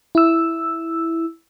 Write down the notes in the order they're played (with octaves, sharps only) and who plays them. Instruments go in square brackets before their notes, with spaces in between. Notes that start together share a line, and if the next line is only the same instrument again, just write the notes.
[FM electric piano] E4 E6